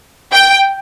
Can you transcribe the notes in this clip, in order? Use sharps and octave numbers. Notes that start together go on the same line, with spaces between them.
G5